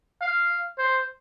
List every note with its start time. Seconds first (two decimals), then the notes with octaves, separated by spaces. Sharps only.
0.22 F5
0.79 C5